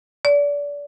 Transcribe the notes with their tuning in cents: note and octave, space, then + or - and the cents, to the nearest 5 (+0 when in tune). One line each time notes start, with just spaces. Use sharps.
D5 -30